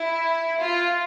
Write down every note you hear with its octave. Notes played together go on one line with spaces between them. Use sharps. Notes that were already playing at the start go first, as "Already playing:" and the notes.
Already playing: E4
F4